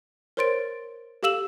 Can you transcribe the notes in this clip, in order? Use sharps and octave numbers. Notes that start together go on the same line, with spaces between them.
A#4 C5 C#5 C6 A6 D7
G4 A4 F5 E6 E7 F#7